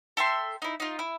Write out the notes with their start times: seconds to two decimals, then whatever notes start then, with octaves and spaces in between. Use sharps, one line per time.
0.17 A4 E5 G5 C6
0.62 D#4 E4
0.80 D#4 F4
0.99 E4